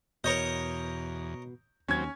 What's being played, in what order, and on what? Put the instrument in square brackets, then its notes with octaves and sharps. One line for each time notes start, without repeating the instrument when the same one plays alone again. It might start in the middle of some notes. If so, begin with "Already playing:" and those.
[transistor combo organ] E2 [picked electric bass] B2 [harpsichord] A#4 C#5 D#5 [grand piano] G6
[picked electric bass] D#2 [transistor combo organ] F#3 C4 [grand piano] C#4 G#6